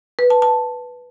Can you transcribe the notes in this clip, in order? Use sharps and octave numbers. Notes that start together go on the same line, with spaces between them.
B4
A5
A5